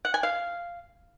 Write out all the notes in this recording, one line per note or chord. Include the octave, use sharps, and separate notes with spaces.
F#5
G#5
F5